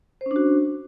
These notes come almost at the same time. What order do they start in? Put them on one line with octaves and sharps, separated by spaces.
C5 C#4 D4 F#4